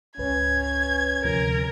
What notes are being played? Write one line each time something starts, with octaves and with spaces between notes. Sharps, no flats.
G#1 C#2 C#4 B4 G#6
D2 C3 F3 A#4